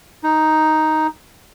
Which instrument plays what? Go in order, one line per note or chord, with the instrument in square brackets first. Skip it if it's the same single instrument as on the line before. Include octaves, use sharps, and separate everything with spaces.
[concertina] D#4